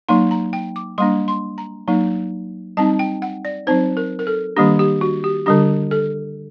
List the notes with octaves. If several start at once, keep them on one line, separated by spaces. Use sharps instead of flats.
F#3 A#3 D#4 C6
A#5
G5
D6
G3 A#3 D4 C6
C6
A#5
F#3 A#3 D#4
G3 C4 D#4 A5
G5
F#5
D5
F#3 C4 D#4 C5
A#4
A#4
A4
D#3 G3 A#3 D4 G4
G4
F#4
G4
D3 G3 D4 G4
A4